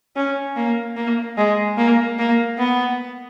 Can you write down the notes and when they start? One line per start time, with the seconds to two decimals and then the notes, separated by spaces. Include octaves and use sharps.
0.16 C#4
0.56 A#3
0.96 A#3
1.37 G#3
1.77 A#3
2.18 A#3
2.58 B3